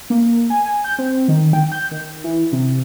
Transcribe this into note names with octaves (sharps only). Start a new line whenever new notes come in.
A#3
G#5
G#5
G6
C4
D#3
G5
G6
D#3
E3
C3